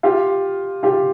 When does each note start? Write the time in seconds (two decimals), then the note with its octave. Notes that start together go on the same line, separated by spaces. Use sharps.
0.03 F4 G4
0.83 F4 G4